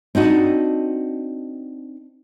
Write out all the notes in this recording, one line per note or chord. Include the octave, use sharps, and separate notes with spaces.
C4 D4 D#4 F#4